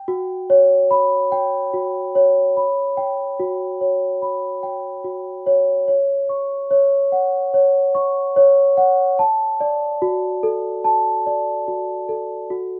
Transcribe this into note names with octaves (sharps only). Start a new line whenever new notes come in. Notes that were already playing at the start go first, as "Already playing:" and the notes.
Already playing: G5
F#4
C#5
B5
G5
F#4
C#5
B5
G5
F#4
C#5
B5
G5
F#4
C#5
C#5
C#6
C#5
F#5
C#5
C#6
C#5
F#5
A5
D5
F#4
A4
A5
D5
F#4
A4
F#4